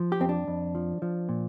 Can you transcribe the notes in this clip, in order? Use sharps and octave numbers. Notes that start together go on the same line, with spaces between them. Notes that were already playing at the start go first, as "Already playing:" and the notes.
Already playing: F3
G4
F2 C4
D4
F2
F3
F3
A#2